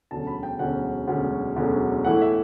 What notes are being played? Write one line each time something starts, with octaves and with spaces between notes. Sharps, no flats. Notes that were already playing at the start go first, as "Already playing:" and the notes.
E1 D2 D3 F#3 C#4 A5
B5
G5
E1 D2 D3 F#3 C#4 F#5
E1 D2 D3 F#3 C#4
E1 D2 D3 F#3 C#4
A2 E3 A3 E4 F#5
E5